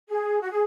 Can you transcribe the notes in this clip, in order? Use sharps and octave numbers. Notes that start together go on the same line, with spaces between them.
G#4
F#4
G#4